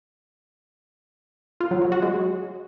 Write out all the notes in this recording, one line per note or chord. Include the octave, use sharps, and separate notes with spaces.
F4
F#3
F#3
F#4
G#3